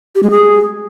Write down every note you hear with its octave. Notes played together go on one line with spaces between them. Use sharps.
G4
G#3
G#4